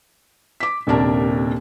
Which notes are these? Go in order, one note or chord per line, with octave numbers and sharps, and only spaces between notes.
D6 B6
D#1 D#2 C3 D4 A#4 A5